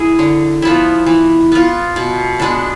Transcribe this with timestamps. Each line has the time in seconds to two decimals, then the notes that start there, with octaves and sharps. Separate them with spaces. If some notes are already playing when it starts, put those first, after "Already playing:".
Already playing: E4 G#4
0.19 D3
0.62 F3 B3 E4
1.06 E3
1.52 B3 F4
1.96 B2
2.40 G#3 B3 D4